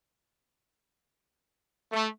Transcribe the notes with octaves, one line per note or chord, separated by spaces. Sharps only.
A3